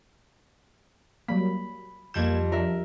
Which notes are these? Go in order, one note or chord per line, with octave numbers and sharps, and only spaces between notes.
F#3 G3 A#3 B5
F2 G3 A#3 G6 G#6 E7
F3 D4 A#4 E5